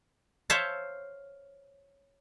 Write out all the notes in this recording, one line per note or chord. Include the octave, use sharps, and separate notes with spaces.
C5 C#5 E5 F5 A5